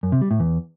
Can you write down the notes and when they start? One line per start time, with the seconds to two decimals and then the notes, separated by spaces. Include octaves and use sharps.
0.03 F#2
0.12 C3
0.21 G3
0.31 A2
0.40 E2